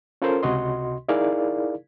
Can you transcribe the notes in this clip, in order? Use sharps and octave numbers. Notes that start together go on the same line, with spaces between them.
C#4 F4 A4 A#4 C5
C#2 C3 F#4 D#5 C6
D#4 E4 G#4 A#4 D5 F5